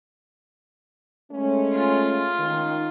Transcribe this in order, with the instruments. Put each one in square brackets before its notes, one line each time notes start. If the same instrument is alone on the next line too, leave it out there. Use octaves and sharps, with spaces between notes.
[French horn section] G#3 A3 C#4
[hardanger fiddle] F4
[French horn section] D#3